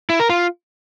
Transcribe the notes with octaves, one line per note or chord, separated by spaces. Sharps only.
E4
A#4
F4